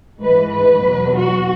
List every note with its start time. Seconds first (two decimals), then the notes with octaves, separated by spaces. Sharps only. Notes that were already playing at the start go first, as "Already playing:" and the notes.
0.21 G#2 E3 G#3 B4
0.52 B4
0.83 E2 B2 F#3
1.15 F#4